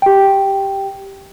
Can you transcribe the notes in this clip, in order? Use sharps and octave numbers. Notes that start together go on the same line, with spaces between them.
G4 G5